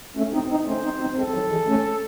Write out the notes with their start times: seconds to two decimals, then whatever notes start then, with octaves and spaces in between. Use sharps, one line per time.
0.17 A3 C#4
0.33 C4 D#4
0.50 C4 D#4
0.67 A3 C#4 C5
0.84 C4 D#4
1.00 C4 D#4
1.17 G#3 C4 A4
1.34 D#3 F#3
1.51 E3 G#3
1.68 A3 C#4